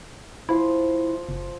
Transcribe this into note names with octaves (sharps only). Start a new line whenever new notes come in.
F3 E4 C5
F#1